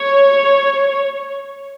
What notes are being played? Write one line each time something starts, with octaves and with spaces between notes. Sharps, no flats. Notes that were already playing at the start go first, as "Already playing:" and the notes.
Already playing: C#5